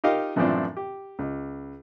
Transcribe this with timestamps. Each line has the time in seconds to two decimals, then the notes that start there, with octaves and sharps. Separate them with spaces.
0.04 D#4 F4 G4 A#4 D#5 F5
0.36 F#2 A2 E3 F3 C4 D4
0.77 G4
1.19 C#2